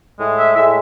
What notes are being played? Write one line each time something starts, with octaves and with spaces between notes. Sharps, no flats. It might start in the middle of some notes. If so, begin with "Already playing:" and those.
A2 G#3
E5
A2 G#3 E5